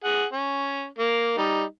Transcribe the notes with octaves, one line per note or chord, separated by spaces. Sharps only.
G#4 F#5
C#4
A#3
G3 D#4